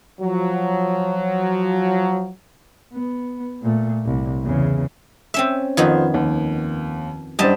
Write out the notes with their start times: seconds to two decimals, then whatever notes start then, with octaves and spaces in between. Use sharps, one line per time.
0.21 F3 F#3
2.94 B3
3.63 A#2 A3
4.05 C2
4.43 E2 C#3
5.34 C4 C#4 E5
5.77 F2 D#3 B3 F4 C5 G#6
6.14 D#2
7.39 F#2 G3 D4 C5 D#5 A5